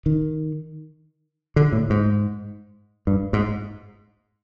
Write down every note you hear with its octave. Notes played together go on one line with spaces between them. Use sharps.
D#3
D3
A2
G#2
G2
G#2